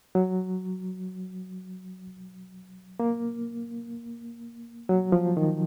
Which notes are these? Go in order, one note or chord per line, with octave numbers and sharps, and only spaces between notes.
F#3
A#3
F#3
F3
D#3